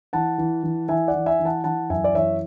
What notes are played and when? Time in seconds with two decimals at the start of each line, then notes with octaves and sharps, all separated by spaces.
0.13 E3 F#5 A5
0.38 E3
0.63 E3
0.89 E3 E5 G#5
1.08 D5 F#5
1.14 E3
1.26 E5 G#5
1.39 E3
1.45 F#5 A5
1.64 E3 F#5 A5
1.90 F#2 E5 G#5
2.04 D5
2.15 E3 C#5 E5